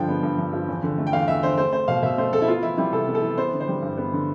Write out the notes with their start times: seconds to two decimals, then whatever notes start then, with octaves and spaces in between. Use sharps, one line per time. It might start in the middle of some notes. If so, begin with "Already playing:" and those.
Already playing: G2 D3 F3 G5
0.08 B3
0.23 G2
0.38 G2
0.53 F3
0.68 E2
0.83 D3
0.98 A3
1.07 G5
1.13 E2 F5
1.28 E2 E5
1.43 D3 C5
1.58 A3 C5
1.73 A3 C5
1.88 B2 F5
2.02 B2 E5
2.18 A3 C5
2.33 A3 A4
2.42 E4
2.48 B3 F4
2.63 E3 E4
2.78 G3 E4
2.93 C3 A4
3.07 B3
3.15 A4
3.23 E3
3.37 B3 C5
3.53 D3
3.60 C5
3.68 G3
3.82 G2
3.98 B3
4.13 D3